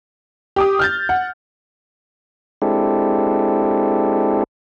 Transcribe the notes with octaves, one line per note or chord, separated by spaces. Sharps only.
G4 D6 D#6
F6 G6 A6
F#5
G#3 C4 D4 E4 G4 A4